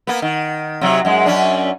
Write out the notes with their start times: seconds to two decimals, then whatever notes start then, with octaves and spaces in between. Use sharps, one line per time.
0.07 A#3 B3
0.22 D#3
0.81 C3 F#3
1.05 F#2 G#3
1.26 F#2 C#4 D4